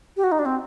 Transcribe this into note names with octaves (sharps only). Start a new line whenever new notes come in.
G4
F#4
D#4
D4
C4